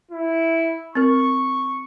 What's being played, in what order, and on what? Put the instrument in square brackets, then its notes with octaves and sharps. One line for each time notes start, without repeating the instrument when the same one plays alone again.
[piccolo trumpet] E4
[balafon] C4 A#4 [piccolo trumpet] C#6